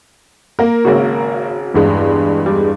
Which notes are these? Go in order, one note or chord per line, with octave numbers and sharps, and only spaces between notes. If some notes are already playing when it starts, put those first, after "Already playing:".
A#3 A#4
G#1 C#3 F#4
E2 G2 G#3
G3